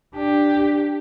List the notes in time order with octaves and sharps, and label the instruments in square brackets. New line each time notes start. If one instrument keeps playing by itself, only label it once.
[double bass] D4 [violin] G4